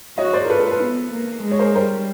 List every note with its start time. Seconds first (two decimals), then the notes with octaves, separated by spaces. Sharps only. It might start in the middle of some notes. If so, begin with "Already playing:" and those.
0.18 F#4 C#5 D#5
0.33 C5 D5
0.44 A#4
0.50 F4 A4 B4
0.60 A4 B4
0.71 A4 B4
0.81 B3
1.12 A#3
1.44 G#3
1.51 C#5
1.59 A#4 C5
1.75 G3 A#4 C5